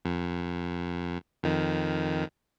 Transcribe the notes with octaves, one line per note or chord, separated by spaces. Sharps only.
F2
F2 D#3